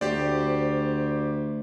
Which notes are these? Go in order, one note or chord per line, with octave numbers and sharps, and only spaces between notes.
D2 G4 C5 D5